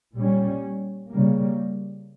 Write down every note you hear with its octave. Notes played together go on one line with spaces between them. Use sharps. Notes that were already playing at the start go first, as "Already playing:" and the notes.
A#2 G3 C#4
C#3 G3 A#3